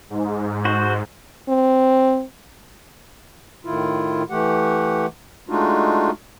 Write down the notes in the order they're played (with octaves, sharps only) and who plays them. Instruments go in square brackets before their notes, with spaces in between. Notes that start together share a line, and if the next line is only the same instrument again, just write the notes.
[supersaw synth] G#2
[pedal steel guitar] F#4 C5
[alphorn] C4
[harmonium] A2 D#3 E4 F4
E3 A3 G4 F#5
G#3 A3 D4 D#4 F4 F#4